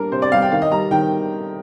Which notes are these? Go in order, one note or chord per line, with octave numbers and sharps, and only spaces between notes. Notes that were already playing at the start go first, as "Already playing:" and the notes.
Already playing: G3 A#3 D4 A#4
C3 C5
D5
G3 F5
G5
D#3 F5
D#5
G3 A#5
D#3 G5